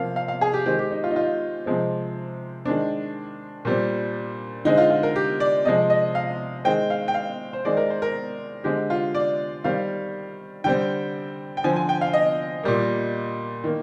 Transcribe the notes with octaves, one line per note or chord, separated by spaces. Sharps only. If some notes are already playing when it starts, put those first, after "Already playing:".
Already playing: C3 F3 A#3 F5
F5
F5
G#4
G4
D#3 G#3 C4 G4
G4
D#4
F4
D#4
F4
C3 F3 G#3 C4
D#3 G#3 C4 D4
A#2 G3 C4
D3 G#3 C4 D#4
F4
F4
A#4
G4
D5
C3 F3 G#3 D#5
D#5
F5
D#3 G#3 C4 G5
F5
G5
F5
C5
D#3 G#3 C4 D5
A#4
C5
A#4
D3 G#3 C4 G4
F4
D5
D#3 G3 C4 F5
D3 G3 C4 G5
G5
D3 F3 C4 G#5
G#5
G5
F5
D#5
A#2 G3 A#3
D#3 A#3